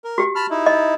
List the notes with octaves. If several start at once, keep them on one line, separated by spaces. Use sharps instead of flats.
A#4
F#4 G4
A5 B5 F6
D#4 E4
D#5